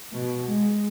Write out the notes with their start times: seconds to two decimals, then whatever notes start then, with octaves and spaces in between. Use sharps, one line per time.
0.13 B2
0.47 G#3